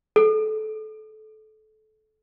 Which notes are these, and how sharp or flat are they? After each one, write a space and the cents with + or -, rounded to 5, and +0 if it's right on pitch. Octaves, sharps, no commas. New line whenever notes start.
A4 -25